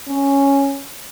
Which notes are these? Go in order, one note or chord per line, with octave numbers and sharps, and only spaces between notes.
C#4